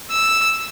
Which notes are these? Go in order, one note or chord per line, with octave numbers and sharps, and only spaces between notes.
E6